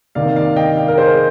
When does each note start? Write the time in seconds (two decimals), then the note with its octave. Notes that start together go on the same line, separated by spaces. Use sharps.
0.15 C3 D#3 A#3 D5 F5
0.36 D5 F5
0.56 D#5 G5
0.77 D5 F5
0.88 A#4
0.97 G#4 C5